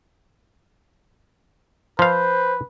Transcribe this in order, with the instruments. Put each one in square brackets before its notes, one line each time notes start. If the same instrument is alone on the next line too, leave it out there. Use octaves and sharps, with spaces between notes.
[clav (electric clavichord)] F3 F5 [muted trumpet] B4 [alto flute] C5